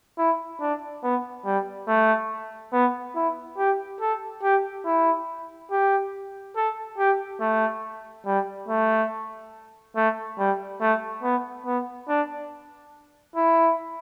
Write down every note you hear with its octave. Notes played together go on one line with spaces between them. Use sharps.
E4
D4
B3
G3
A3
B3
E4
G4
A4
G4
E4
G4
A4
G4
A3
G3
A3
A3
G3
A3
B3
B3
D4
E4